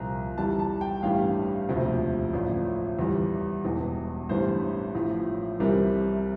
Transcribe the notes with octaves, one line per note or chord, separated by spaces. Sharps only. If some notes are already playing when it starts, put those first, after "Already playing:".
Already playing: C2 A#2 F3 A#5
E2 E3 G3 A5
A5
G5
A1 G2 E3 G3 F5
E1 D2 C3 F3
A1 A2 F3 D5
E2 E3 G3
E1 E2 E3
A1 G2 E3 G3 C5
A1 A2 F3
C2 C3 E3 G3 A#4